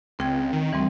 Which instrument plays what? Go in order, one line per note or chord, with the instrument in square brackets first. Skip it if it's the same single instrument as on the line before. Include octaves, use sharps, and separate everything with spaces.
[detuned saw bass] C#2 [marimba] C4 G5 G#6
[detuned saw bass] D#3
[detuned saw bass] D2 [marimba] E3 G3 C4